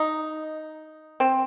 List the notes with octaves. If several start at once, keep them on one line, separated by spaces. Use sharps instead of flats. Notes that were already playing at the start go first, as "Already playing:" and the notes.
Already playing: D#4
C4